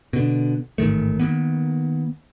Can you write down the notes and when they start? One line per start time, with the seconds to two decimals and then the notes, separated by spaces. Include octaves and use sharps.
0.13 B2 D3
0.78 A1 G#2 D#3 A3
1.19 D#3 F#3 A#3 B3